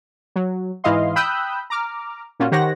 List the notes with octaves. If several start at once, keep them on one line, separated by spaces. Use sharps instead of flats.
F#3
G#2 E3 E4 D#5 F5 C6
G5 B5 D#6 E6 F#6 G6
A#5 D6 F6
A#2 C#4 F4 F#4
D#3 G4 C5 C#5 F#5 A#6